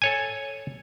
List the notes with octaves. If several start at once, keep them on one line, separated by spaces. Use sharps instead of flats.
A4 C#5 G#5